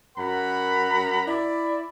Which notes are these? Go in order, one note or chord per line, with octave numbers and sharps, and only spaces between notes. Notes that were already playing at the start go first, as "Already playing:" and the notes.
F#2 A#4 F#5 A#5 B5
E4 D5